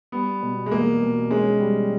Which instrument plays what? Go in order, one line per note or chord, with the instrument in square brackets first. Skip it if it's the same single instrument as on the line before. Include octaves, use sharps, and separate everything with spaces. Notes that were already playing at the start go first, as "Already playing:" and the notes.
[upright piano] G3 [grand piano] B3
[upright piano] B2
[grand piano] G#3
[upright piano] E2 [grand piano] A#3
[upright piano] B2
[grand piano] G#3 [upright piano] C#4
[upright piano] G3